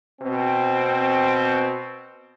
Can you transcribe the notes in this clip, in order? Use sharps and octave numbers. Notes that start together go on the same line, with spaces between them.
B2 C4